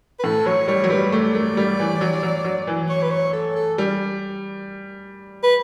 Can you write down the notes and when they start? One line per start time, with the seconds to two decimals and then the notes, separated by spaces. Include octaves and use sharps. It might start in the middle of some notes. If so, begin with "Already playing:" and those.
0.20 B4
0.24 A2 A4
0.46 F#3 C#5
0.68 G3 C#5
0.84 F#3
0.90 G3 B4
1.12 A3 D5
1.35 A3
1.57 G3
1.79 E3
2.01 F#3
2.23 F#3
2.45 F#3
2.67 E3
2.89 C#5
3.03 B4
3.11 C#5
3.33 A4
3.56 A4
3.78 G3
5.43 B4